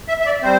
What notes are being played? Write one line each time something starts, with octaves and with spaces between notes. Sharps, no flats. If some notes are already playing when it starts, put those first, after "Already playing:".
E5
E5
D5
G3 C4 C5